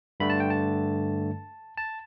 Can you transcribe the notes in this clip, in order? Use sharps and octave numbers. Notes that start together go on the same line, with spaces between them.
G2 D3 A3 B5
A5
G5
A5
A5